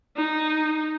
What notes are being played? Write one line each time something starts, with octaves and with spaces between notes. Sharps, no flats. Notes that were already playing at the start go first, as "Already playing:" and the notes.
D#4